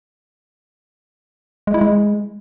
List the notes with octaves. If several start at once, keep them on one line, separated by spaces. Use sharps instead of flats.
G#3
E4
G#3